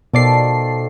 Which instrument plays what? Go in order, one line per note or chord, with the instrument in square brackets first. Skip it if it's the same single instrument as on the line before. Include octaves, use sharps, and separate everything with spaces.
[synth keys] B2 D5 C7 [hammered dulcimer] D#3 F3 A4